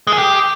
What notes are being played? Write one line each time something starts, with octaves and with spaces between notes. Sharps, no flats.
G#3
G#4
G4